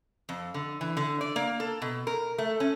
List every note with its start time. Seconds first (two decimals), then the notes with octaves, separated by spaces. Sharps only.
0.29 F2
0.54 D3
0.81 E3
0.97 D3
1.21 D5
1.36 A#3
1.60 A4
1.82 B2
2.07 A#4
2.38 A3
2.60 C#4